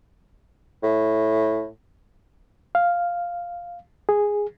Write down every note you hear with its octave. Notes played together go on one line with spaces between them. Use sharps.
A2
F5
G#4